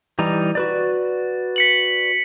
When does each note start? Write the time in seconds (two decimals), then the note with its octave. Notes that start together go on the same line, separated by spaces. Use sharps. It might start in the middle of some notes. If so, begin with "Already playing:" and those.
0.19 E3 G3 D#4
0.55 F#4 B4 D5
1.56 B6 C#7 F#7